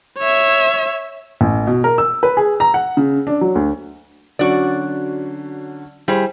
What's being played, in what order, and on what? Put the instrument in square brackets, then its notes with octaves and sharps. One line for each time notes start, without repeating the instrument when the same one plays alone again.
[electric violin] C#5 E5
[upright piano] A1
B2
A#4
E6
B4
G#4
A#5
F#5
C#3
D4
F#3
D2
[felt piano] D3 F#3 C#4 [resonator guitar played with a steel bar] F#4 D5
[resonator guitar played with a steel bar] G3 G#4 [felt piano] E4 C5